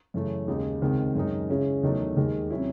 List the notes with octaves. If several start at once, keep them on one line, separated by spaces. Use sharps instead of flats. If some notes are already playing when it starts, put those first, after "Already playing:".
F#2 C#3 E3 A3 C#4
D#2 C#3 G#3 D#4
C#2 C3 D#3 G#3 C4
F#2 D#3 G#3 D#4
C#3 G#3 C#4 E4
E2 D#3 F#3 A3 D#4
D#2 D#3 G#3
C3 F#3 C#4 E4